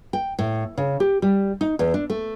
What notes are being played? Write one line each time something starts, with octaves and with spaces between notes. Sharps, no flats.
G5
A2
C#3
G4
G3
D#4
E2
D4
A3